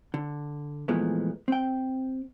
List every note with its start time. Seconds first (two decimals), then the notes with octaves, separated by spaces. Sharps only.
0.14 D3
0.88 A#2 E3 F3 G#3 A3 B3
1.48 C4 G5